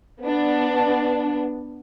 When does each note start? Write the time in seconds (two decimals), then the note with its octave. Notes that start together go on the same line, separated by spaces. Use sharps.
0.21 B3 D4